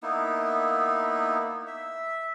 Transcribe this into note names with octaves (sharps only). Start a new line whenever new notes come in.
A#3 B3 D#4 E4
E5